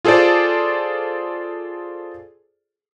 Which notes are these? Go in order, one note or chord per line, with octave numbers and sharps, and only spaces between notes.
F4 G#4 A4 C5 D5